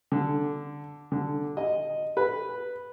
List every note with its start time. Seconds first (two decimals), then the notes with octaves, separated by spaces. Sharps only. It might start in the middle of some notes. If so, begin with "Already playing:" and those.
0.12 D3
1.12 D3
1.57 D#5
2.17 B4